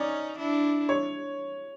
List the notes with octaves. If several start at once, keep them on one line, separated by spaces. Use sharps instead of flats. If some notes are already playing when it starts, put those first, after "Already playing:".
Already playing: C#4 D#4 D5
D4 E4
C#5